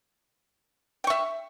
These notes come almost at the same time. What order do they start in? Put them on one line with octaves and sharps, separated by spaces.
G5 C#6 E5